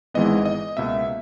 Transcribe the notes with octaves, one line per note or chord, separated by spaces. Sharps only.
G#1 G#2 E3 G#3 B3 D#5
D#5
C#2 B2 A#3 E5